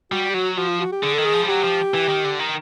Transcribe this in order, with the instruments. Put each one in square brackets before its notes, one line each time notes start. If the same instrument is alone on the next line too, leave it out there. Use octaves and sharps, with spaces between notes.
[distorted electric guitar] G3 [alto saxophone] F#4
[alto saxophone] G4
[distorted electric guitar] F#3 [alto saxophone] F#4
[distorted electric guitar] F3 [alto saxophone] F#4
[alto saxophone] F4
F#4
G4
[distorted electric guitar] D3 [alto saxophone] G#4
[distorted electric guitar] D#3 [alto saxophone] A4
[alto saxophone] G#4
[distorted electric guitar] F3
G3
[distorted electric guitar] F#3 [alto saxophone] G4
[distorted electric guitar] F3
E3
D#3
D3
D#3